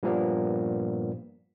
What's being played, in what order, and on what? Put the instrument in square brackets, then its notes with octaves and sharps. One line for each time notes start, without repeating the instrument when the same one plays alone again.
[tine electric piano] G2 A#2 F3 A#3 B3